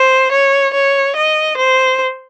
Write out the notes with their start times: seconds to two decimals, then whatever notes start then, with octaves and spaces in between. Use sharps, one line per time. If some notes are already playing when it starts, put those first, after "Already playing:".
Already playing: C5
0.32 C#5
0.74 C#5
1.16 D#5
1.57 C5